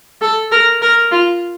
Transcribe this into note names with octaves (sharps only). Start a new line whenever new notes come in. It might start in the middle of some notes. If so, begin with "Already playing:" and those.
A4
A#4
A#4
F4